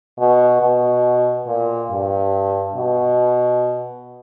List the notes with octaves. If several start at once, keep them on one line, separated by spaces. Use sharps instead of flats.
B2
B2
A#2
G2
B2